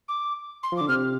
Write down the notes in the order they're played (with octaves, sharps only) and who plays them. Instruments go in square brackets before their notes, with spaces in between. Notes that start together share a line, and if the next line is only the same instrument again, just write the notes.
[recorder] D6
C6
[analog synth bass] F3
[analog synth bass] D3 [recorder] D6
[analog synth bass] C3 [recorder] F6